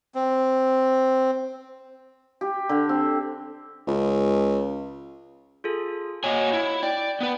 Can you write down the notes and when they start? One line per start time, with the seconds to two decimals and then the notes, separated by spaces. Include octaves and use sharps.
0.15 C4
2.41 G4
2.69 D3
2.89 C4
3.87 C#2
5.64 F4 G#4 A4
6.24 A#3 F#4 C#5 D#5 F#5 G#5
6.53 E4
6.83 D5 G5
7.21 B3 B4